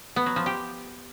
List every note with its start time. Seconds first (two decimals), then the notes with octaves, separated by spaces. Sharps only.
0.16 B3
0.26 F#3
0.36 F3
0.46 G4